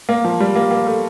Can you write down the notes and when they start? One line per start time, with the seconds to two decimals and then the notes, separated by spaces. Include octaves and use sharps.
0.09 A#3
0.25 F3
0.40 G3
0.56 A#3
0.71 A#3
0.87 A3